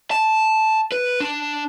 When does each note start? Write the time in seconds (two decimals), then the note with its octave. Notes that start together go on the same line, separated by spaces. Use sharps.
0.11 A5
0.92 B4
1.20 D4